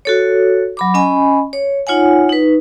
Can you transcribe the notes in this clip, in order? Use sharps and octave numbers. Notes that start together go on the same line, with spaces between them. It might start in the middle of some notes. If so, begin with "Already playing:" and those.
F#4 A4 C#5
F#3 B5 D6
C#4 D#5 G#5 B5
C#5
D#4 F4 C#5 F#5 G#5
D#4 B4